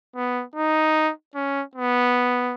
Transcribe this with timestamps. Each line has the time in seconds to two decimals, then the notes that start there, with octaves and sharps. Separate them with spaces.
0.15 B3
0.55 D#4
1.35 C#4
1.75 B3